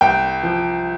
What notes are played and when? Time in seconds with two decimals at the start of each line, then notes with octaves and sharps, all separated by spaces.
0.01 C2 G5
0.43 F3